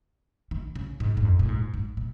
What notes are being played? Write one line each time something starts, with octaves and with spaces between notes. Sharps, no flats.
D#3
C#3
G#2
G#2
F2
A#2
G#2
G#2
A#2